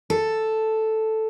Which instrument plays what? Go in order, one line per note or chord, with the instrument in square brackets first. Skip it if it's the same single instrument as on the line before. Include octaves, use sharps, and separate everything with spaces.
[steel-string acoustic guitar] A4